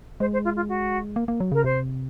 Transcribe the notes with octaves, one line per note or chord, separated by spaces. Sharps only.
G#3 C5
C5
F4
F4
F#4
A#3
A#3
F#3
C#3 A#4
C3 C5